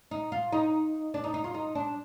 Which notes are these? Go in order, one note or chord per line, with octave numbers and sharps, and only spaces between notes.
D#4
F4
D#4
D4
D#4
D#4
F4
D#4
D4